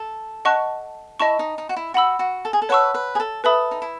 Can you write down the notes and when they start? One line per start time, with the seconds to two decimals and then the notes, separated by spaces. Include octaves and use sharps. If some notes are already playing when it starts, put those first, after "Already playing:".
Already playing: A4
0.45 D#5 F#5 A5 C#6 F#6
1.20 E4 D#5 A5 C#6
1.39 D#4
1.58 D#4
1.69 F#4
1.76 E4
1.94 F#4 F#5 B5 E6
2.19 F#4
2.45 A4
2.53 G#4
2.62 A4
2.69 B4 C#5 F#5 A5 C#6 E6
2.94 B4
3.15 G#4
3.20 A4
3.44 A4 B4 E5 B5 D#6
3.71 D#4
3.82 E4